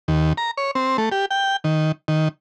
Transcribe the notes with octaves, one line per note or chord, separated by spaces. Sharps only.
D#2
A#5
C#5
C4
A3
G4
G5
D#3
D#3